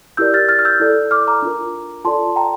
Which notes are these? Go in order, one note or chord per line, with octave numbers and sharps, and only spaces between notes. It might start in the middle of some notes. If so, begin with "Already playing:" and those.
E4 G4 A#4 D5 E6 G6
F6 A6
F6 A6
F6
E6 G6
E4 A4 D5
D6 F6
A#5 D6
D4 F4 A#4
F4 A4 D5 A5 C6
G5 A#5